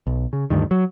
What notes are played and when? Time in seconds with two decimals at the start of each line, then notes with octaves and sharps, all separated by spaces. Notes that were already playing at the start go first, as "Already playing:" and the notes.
0.07 B1
0.33 C#3
0.50 D2 G2 D#3
0.71 F#3